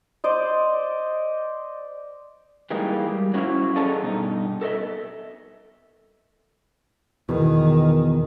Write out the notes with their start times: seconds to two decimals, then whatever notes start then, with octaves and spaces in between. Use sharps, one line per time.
0.24 C5 D5 D#5
2.70 E3 G3 G#3 A#3 D#4
3.07 G3
3.34 F#3 C#4 E4 C5 F5
3.76 G#4 A4 D5 D#5 A5 A#5
4.02 G2 B2 D#4
4.61 A4 A#4 C#5 D#5 E5
7.29 E2 B2 D#3